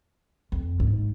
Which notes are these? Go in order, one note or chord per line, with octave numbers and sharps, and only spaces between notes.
F2
G#2